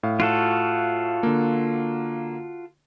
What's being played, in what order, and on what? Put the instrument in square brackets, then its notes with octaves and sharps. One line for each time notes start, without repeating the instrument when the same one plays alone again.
[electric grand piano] A2 F5
[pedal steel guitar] F4 F#4 A4
[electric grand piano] D3 A#3